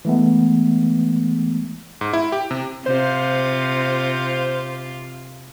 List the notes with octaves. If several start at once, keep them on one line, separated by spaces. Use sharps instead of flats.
E3 G#3 A3 B3
G#2
E4
G4
C3
C3 F4 C5